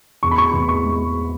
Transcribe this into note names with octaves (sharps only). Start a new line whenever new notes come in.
E2 C#6
B5
C#6
E2
C#6
G#3